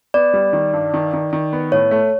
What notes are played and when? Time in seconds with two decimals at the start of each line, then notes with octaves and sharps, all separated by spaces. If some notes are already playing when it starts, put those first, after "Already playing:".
0.14 B3 D5
0.34 G3
0.53 D#3
0.73 G2
0.94 D#3
1.13 D#3
1.33 D#3
1.53 B3
1.72 A2 C#5
1.91 A3